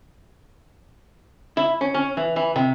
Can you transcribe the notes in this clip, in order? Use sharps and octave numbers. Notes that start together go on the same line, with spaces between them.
E4
C#4
C#4
E3
E3
C3